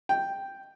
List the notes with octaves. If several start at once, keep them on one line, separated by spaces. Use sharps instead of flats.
G5